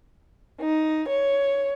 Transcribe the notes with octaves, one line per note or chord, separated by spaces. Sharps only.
D#4
C#5